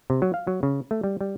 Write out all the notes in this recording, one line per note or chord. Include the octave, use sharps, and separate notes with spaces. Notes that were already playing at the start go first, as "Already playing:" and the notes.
C3
F#3
F5
F#3
C#3
A3
G3
G3